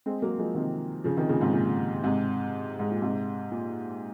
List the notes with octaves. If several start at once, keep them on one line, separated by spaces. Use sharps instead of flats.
G#3 C4
F#3 A#3
F3 G#3
C3 D#3
C#3 F3
C3 D#3
A#2 C#3
G#2 C3
A#2
G#2 C3
G#2
A#2
G#2 C3
A#2